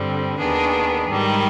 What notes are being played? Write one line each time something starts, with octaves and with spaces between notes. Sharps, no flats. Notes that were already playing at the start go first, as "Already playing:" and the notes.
Already playing: G2 D3 G3 C4
D#2 D#3 B3 D4 G#4
G#2 D#3 G3